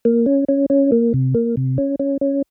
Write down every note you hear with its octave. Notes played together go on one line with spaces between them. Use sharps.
A#3
C#4
C#4
C#4
A#3
C3
A#3
C3
C#4
C#4
C#4